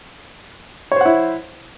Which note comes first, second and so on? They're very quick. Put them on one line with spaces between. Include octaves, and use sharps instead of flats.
C#5 C5 F#5 E4